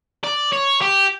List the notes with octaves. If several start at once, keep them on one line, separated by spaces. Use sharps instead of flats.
D5
C#5
G4